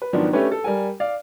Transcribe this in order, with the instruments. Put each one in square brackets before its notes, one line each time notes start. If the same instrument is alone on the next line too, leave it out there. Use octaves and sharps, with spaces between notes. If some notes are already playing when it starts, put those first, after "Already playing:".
[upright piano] B4
G#2 D#3 F3 F#3 B3 D4
A3 C#4 D4 G4 B4 C#5
A4
G3 A#4 G#5
D5 F5